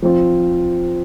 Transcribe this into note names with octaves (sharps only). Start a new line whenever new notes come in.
F3 C4 F4